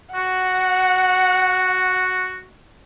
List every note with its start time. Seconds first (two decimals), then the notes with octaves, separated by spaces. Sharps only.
0.14 F#4 F#5